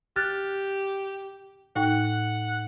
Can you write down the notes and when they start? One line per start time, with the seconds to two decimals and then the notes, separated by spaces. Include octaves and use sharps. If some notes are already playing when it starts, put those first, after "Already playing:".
0.16 G4 F6 F#6 A6
1.76 A2 D#4 F#5 G5